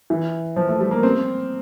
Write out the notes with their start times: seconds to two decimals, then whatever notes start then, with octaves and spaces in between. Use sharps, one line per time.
0.10 E3
0.56 F3
0.68 A3
0.80 G3
0.91 A#3
1.03 C4